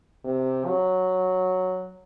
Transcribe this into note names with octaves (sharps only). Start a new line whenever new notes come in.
C3
F#3